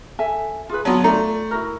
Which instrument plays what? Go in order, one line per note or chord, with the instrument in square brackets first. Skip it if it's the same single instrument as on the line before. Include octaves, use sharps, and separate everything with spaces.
[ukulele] A4 E5 G#5
F4 G#4 B4
[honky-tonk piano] F#3 B3 [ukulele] F4 A5
[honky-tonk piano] A3 [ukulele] F4 D5 A#5
[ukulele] E4 F#4 A#4